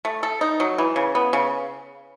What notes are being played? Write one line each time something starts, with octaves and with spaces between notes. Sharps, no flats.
A3
A4
D#4
F#3
E3
C#3
B3
C#3